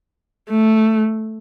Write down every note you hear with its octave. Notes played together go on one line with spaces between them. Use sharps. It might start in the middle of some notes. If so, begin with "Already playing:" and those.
A3